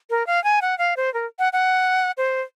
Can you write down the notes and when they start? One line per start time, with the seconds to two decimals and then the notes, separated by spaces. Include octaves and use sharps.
0.10 A#4
0.27 F5
0.44 G#5
0.62 F#5
0.78 F5
0.97 C5
1.14 A#4
1.39 F#5
1.53 F#5
2.18 C5